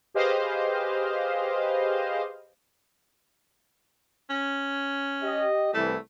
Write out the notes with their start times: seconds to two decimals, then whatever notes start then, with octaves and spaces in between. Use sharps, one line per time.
0.14 G4 G#4 B4 C5 D#5 F5
4.30 C#4
5.23 G4 D#5
5.74 C2 E3 A3